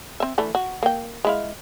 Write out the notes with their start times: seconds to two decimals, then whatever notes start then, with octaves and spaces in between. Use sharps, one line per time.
0.20 C4 E5
0.38 E3 A3 D4
0.55 F#4
0.83 A#3 G5
1.25 G#3 E4 F5